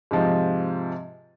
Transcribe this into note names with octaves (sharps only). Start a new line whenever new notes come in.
G#2 C3 F3